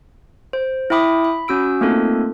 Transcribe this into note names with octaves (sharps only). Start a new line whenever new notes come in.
C5
E4 E5 G5 B5 D6 D#6
B5
C#4 F#4 E6 D7
A3 A#3 C4 D#4 F4 A4